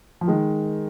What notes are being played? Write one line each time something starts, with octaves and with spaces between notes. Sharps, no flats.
F3
D#3 G#3